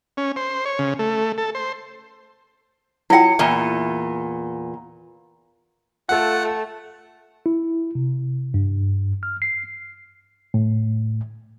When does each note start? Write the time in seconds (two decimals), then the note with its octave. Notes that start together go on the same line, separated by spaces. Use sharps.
0.17 C#4
0.36 C5
0.65 C#5
0.79 C#3
0.99 A3
1.38 A4
1.55 C5
3.10 F#3 E4 F4 F#5 G5
3.39 E2 A#2
6.09 A3 F4 A4 F#5 A5
7.46 E4
7.95 C3
8.54 G2
9.23 F6
9.42 C7
10.54 A2